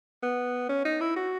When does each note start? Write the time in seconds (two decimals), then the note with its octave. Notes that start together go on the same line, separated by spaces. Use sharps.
0.23 B3
0.69 C#4
0.85 D#4
1.01 E4
1.16 F#4